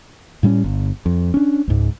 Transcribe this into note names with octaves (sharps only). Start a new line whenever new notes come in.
A2 G3 A#3 C#4
G1
F2
C#4 D4
C#2 G#2